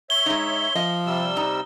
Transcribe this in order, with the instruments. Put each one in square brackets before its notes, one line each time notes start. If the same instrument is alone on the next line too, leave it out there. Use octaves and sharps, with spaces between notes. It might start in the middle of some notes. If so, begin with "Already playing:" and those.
[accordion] C#5 E5 [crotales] G7
[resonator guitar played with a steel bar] G#3 D#4
[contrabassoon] F3 [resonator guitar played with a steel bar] D#5
[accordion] C3 G3 E6
[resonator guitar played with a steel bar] D#4